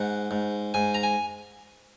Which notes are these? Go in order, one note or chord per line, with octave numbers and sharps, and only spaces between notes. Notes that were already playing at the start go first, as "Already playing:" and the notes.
Already playing: G#2 F#5
G#2
G#2 G#5
A#5
G#5